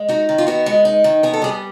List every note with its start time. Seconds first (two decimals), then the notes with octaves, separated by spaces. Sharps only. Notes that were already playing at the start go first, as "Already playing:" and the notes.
Already playing: G#3
0.08 D#4 F#4
0.29 D#3
0.38 F4
0.47 B3 F#4
0.66 G#3
0.85 D#4
1.04 D#3
1.23 B3 G#4
1.33 A4
1.42 G3 G#4